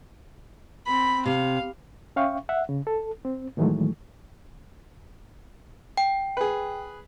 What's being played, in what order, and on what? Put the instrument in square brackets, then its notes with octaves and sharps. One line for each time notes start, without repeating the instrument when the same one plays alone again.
[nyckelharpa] C4 B5
[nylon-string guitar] C3 [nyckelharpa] F5
[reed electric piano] C#4 E5 F5 G5 C#6
E5 F#5
C#3
A4
C4
A2 D#3 E3 F#3 G#3 A3
[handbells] G5
[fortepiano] G#4 B4